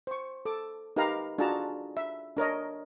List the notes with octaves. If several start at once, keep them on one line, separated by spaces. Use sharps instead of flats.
C5 C#6
A4 D6
D#4 G4 A#4 B4 F5 A#5
D4 F4 F#4 G#4 A5 A#5
E5
D4 A#4 C#5 D#5